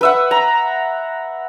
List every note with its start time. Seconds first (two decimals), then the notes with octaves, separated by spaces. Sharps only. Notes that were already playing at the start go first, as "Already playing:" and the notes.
0.01 B4 E5 F#5
0.31 A#5